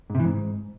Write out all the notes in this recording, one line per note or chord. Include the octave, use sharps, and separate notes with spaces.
G#2
C3
E3
G#2